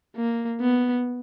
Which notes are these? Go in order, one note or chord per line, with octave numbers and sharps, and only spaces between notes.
A#3
B3